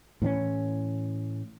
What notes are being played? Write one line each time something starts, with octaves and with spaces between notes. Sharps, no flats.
A2 E3 C4 C#4